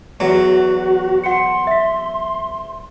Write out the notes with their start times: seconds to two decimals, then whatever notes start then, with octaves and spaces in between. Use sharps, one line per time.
0.20 E2 F#3 F#4
1.24 F#5 C6 C#7
1.67 E5 B6